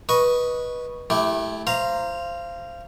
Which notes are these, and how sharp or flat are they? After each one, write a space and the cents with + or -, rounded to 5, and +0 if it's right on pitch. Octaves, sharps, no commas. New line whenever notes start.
B4 -15 D#5 +0 C#6 +0
A3 -30 E4 +0 G4 +0
C5 +0 F5 -25 A#5 +0